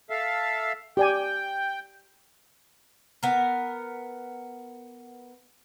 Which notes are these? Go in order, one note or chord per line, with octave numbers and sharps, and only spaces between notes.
A4 E5 F5
G4 D5 G5 G#5
B3 A#4